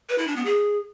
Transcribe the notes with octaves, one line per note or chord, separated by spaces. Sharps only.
B4
E4
D4
B3
G#4